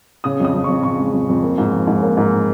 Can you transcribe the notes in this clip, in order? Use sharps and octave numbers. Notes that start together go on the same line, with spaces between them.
C#3 D#6
F2 D#6
F2
F2 C#6
C#3 C#6
G#3
F2
F2
A#3
G#2
F3
G#2
A#3
G#2